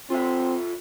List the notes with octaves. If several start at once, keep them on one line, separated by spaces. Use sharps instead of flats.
C4 F4 A4 E5